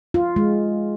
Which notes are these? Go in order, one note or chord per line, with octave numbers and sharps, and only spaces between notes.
F4
G#3